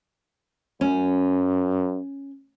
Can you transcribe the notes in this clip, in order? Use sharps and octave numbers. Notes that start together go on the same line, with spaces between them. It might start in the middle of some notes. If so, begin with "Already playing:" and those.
F#2 C#4